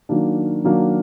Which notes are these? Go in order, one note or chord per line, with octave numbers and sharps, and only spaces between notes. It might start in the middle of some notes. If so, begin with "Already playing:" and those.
D#3 F#3 A#3 D4
D#3 F#3 A#3 D4